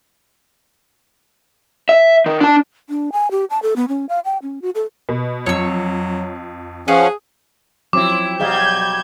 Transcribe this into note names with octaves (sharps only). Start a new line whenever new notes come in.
E5
D#3
D4 A5
D4
G#5
G4
A5
A4
B3
C#4
F5
G5
C#4
F#4
A4
B2
F2 F#3 C#5 E6
F3 C#4 G#4 B4 F5 F#5
F3 F#3 C4 E4 D6
B2 F#3 G3 G#4 D#5 F5 G6 G#6